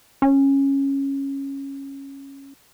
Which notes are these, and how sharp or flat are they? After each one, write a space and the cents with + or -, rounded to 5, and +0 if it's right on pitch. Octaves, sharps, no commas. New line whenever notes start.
C#4 -10